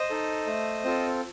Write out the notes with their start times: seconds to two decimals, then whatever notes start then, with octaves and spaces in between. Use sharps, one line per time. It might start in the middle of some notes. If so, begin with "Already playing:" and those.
Already playing: C5 D#5
0.10 D#4 A4
0.47 A3
0.84 C4 F4 A4